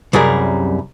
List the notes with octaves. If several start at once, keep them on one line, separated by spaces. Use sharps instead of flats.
C2 F#2 G3 G#4 A#4